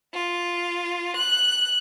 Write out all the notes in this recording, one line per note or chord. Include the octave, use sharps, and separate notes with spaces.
F4
F#6